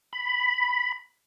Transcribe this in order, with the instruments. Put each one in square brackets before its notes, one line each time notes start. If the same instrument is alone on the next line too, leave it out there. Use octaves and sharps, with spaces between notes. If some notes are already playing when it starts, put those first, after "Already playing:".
[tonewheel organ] B5